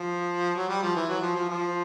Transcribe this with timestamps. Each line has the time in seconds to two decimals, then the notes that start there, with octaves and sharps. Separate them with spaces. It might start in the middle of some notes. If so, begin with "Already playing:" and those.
Already playing: F3
0.56 F#3
0.69 G3
0.83 F3
0.96 E3
1.09 F#3
1.22 F3
1.35 F3
1.49 F3